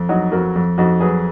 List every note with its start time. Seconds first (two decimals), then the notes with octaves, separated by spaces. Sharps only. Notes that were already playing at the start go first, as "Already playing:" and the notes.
Already playing: F2
0.09 F#3 D#4 F#4
0.32 F2 F#4 A#4
0.56 F2
0.78 F2 D#4 F#4
1.00 F#3 G#4 B4